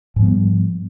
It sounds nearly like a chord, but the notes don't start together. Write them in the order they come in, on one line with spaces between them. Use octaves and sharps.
G#2 F3 B3 G3